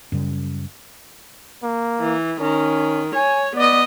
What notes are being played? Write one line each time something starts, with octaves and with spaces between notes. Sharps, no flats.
F#2 C#3 G3
A#3
E3
D#3 C#4
C#5 G#5
B3 D5 D#5